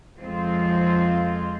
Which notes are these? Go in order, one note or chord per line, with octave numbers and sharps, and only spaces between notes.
F2 F3 G#3 C4 F4